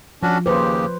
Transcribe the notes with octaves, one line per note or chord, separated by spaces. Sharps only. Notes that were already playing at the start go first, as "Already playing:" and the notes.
F3 C#4 D4 F#4
D#2 C#3 G4 B4 C5